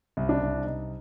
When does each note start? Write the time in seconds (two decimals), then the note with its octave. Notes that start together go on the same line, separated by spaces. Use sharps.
0.17 C2
0.29 D4
0.42 C2
0.66 C2 D#4